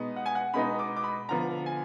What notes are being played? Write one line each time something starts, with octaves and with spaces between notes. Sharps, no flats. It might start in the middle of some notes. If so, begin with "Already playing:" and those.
Already playing: B2 G#3 B3 D#4
F#5
G#5
F#5
B2 G#3 B3 D#4 B5
D6
D6
B5
D3 F3 B3 A#5
G#5